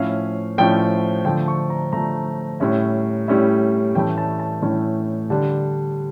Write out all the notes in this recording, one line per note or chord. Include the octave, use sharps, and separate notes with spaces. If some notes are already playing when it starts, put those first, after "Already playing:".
Already playing: A2 F3 C#4 E4 F5
A2 F3 C#4 E4 G5
D3 F3 A3 G5
C#6
A#5
D3 F3 A3 A#5
A2 G3 C#4 E4
A2 G3 C#4 E4
A2 E3 A3 C#4 E4 G5
A5
A5
A2 E3 A3 C#4 E4
D3 G3 D4